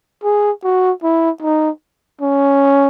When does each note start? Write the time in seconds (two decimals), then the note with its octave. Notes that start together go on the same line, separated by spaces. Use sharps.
0.24 G#4
0.64 F#4
1.03 E4
1.42 D#4
2.22 C#4